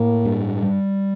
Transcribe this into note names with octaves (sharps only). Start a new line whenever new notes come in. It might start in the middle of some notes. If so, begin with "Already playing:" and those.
Already playing: A2 A#3
G2
G3